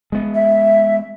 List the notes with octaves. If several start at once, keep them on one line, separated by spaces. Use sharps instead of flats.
G#3 B3
E5